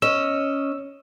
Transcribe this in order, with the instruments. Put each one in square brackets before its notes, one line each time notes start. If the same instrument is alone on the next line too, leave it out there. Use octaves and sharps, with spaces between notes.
[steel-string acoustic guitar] C#4 D#5 [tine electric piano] E6